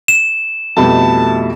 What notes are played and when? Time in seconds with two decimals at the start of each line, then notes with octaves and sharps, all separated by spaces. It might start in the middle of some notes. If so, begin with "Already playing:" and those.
0.08 E7
0.77 F2 B2 G3 A3 E4 A5